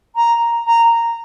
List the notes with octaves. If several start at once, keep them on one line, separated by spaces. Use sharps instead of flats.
A#5
A#5